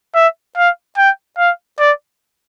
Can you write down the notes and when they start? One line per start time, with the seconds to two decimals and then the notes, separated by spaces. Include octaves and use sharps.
0.15 E5
0.57 F5
0.97 G5
1.38 F5
1.79 D5